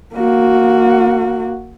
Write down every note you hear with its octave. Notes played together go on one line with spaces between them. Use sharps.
A#3 F#4